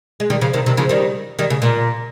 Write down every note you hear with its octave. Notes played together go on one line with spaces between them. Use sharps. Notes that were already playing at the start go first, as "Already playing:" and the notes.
G#3
D#3 G3
C#3 F3
C3 D#3
C3 D#3
C#3 F3
D#3 G3
D#3 G3
C#3
A#2